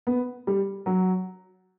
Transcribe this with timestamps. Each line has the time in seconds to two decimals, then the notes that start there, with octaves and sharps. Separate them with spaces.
0.07 B3
0.47 G3
0.86 F#3